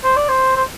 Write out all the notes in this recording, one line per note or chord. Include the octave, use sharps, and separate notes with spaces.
C5
D5
C5
C5